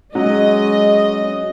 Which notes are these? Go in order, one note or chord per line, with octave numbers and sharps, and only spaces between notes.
F#3 G#3 C#4 D#5